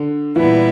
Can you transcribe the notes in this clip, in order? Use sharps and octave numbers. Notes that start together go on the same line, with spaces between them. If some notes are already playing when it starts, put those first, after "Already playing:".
Already playing: D3
A#2 E3 G3 B3 E4